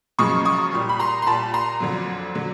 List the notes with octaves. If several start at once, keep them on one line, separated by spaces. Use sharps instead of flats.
F#2 C#3 F3 G#3 C#6 D#6
C#6 D#6
A#2 G3
B5
A#5 C6
C6
A#2 G3 A5 B5
A#5 C6
F2 D3 F#3
D3 F#3